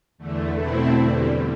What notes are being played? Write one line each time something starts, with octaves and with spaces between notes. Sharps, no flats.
E2 D3 A3
B2 A3 C4 E4
E2 D3 G3